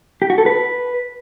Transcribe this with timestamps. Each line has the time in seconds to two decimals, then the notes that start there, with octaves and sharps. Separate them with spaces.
0.22 G4
0.30 F#4
0.38 A4
0.46 B4